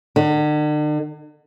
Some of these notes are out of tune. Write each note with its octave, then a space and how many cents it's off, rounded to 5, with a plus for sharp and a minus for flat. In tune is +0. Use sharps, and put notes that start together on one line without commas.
D3 +45